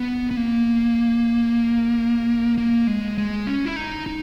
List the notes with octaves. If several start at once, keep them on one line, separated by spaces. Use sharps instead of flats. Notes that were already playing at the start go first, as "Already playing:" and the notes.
Already playing: B3
B3
A#3
A#3
G#3
G#3
C#4
E4
D#4
D#4